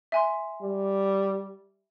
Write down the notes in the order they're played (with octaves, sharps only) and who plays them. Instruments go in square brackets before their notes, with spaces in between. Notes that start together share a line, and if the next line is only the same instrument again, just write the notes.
[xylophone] E5 G#5 C6
[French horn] G3